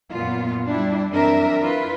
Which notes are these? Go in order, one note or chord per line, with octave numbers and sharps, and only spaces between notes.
F#2 A#2 B3 F4
G3 D4 E4
F#2 E3 C4 D4 A#4 E5
E4 F4 B4